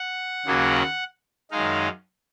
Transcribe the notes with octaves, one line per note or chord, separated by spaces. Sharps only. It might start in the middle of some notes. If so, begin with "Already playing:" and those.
Already playing: F#5
D#2 C#3 F#3 A#3
F#2 D#3 G#3 D#4 F5